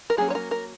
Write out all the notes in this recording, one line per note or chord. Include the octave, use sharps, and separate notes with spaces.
A#4
F#3 A#3 C#4 G#4
C#5
A#4
A#4